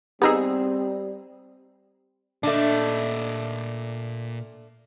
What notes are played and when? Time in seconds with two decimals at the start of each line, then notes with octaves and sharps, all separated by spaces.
0.22 G3 B3 C4 D#4 G4 G#4 A#5 E6
2.43 A#2 A3 D4 D#5